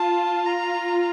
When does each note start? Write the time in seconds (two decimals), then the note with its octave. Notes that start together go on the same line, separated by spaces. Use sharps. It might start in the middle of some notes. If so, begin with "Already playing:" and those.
Already playing: F4 A5
0.46 A#5